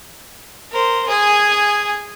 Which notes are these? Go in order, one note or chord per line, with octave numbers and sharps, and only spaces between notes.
A#4 C5
G#4 G#5